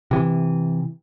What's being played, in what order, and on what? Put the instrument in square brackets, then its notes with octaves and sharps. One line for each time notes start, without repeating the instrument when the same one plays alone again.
[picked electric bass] C3 E3